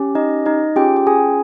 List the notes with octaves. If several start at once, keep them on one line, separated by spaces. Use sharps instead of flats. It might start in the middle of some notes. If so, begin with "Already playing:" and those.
Already playing: C#4 G4
D#4 D#5
D#4 D#5
C#4 F4 G4 G#4 G5
G5
G#4 G#5